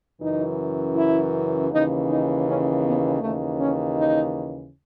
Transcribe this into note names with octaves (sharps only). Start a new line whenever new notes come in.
F#2 C#3 E3 D#4
E4
D#2 C#3 E3 D#4
D#4
C#4
B3
D#2 C#3 E3 A3
C#4
D#4